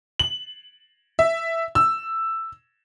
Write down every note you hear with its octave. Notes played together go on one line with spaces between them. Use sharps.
F#7
E5
E6